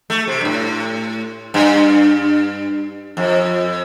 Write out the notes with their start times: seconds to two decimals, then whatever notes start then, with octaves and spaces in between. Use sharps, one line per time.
0.10 A3
0.27 C3
0.41 G2
0.45 A2
1.54 G2
3.17 F2